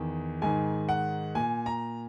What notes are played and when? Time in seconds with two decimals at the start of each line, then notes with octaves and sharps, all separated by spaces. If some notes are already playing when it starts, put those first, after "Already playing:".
Already playing: E2 D#3
0.42 G#2 D#3 G#5
0.89 F#5
1.35 A#2 G#5
1.66 A#5